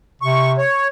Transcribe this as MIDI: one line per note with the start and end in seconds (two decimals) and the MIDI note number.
0.22 0.63 48
0.22 0.52 85
0.58 0.88 73